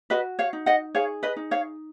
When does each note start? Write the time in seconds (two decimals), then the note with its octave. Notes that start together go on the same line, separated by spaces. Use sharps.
0.10 F#4 B4 D#5
0.39 C#5 F5
0.53 D#4
0.66 D#5 F#5
0.95 G#4 C#5 F5
1.23 B4 D#5
1.36 D#4
1.51 C#5 F5